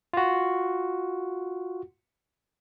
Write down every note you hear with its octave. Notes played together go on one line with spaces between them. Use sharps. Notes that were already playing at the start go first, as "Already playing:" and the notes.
F4 F#4